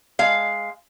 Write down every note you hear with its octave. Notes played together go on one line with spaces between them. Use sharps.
G#3 F5